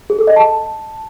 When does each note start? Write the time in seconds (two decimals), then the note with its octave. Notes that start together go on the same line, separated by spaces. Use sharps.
0.10 G#4
0.19 A4
0.27 D#5
0.36 A5